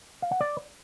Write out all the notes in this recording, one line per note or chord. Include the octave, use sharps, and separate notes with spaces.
F5
F#5
D5